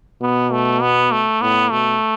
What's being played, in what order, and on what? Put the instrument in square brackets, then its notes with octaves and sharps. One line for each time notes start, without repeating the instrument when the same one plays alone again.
[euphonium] B2 [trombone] B3
[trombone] A3
B3
A3
[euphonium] A2 [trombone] B3
[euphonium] B2 [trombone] A3